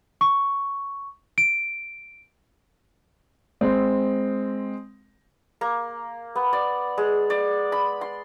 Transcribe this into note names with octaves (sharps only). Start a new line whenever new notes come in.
C#6
D7
G#3 C4
A#3
B3
D5
G#3
D5
B5
C6